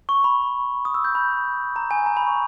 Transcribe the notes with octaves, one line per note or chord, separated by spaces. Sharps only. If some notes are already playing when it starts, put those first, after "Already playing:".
C#6
B5
D#6
E6
G6
B5
A#5
G#5
A#5
B5
C#6